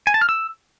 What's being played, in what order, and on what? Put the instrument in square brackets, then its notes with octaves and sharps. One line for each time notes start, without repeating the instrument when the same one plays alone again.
[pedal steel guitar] G#5
A5
F6
E6